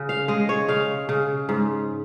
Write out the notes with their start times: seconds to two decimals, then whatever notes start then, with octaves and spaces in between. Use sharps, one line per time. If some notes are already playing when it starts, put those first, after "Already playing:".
Already playing: C#3
0.09 F5
0.28 G#3 D#5
0.49 C#5
0.68 C#3 F5
1.09 C#3
1.49 G#2